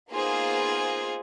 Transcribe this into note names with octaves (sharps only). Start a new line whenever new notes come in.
A#3 B3 D#4 F4 G#4 C5